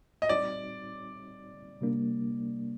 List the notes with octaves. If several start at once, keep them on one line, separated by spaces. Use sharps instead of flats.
D#5
G3 C4 D#4 F#4 D5
C3 G3 A#3 D4